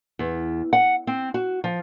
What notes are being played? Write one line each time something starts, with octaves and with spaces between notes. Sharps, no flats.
E2
F#5
C4
F#4
F3